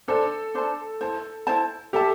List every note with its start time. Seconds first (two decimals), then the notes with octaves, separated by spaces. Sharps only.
0.08 D4 A4 C5 A5
0.54 D4 C5 A5
1.01 E4 C5 A5
1.47 E4 C5 A5
1.93 G4 A4 E5 A5